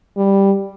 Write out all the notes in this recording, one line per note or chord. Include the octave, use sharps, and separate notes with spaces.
G3